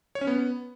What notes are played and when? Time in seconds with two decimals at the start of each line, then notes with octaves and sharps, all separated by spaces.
0.15 C#5
0.21 C#4
0.27 B3